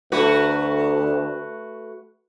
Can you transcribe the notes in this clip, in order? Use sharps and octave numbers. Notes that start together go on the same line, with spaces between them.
D2 A3 F#4 B4